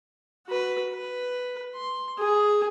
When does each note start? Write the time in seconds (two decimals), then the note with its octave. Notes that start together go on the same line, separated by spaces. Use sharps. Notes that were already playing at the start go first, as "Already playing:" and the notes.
0.47 F#4 B4
0.93 B4
1.75 C6
2.18 G#4